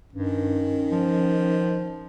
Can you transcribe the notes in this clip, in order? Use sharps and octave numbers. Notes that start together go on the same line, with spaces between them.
G2 D#3 C#4
F3